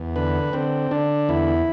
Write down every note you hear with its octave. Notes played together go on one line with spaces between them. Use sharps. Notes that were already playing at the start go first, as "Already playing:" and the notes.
Already playing: E2
D3 B4
D3 C4
D3 D4
E2 E4